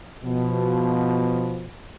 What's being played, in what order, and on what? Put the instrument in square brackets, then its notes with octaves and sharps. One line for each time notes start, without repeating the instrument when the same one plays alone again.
[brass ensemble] B2 F3